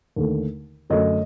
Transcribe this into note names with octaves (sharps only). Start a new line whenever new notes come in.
D#2 D3 A3
F#2 D3 F#3 A3 D#5